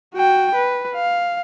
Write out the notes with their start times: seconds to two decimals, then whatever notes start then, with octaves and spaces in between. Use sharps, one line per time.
0.14 F#4 G5
0.55 B4
0.95 F5